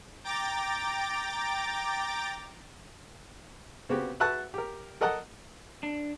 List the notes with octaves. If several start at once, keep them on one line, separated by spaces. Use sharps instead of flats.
G5 A#5 D6 A6
C#3 B3 C4 F#4 G4
F#4 B4 E5 F#5 A5 F#6
G4 A#4
A4 A#4 D#5 F#5 A5
D4